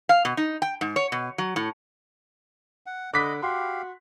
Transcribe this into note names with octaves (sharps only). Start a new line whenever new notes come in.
F5
B2
D#4
G5
G#2
C#5
B2
F#3
A2
F#5
D3 D#5 B5 D6 F#6 B6
F#4 G4 F5 C6